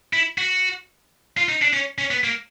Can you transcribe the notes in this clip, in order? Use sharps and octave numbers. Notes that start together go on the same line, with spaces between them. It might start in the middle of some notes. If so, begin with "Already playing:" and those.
E4
F#4
F4
D#4
D4
C#4
C#4
B3
A#3